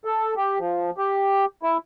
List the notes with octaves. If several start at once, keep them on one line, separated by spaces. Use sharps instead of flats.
A4
G4
F3
G4
E4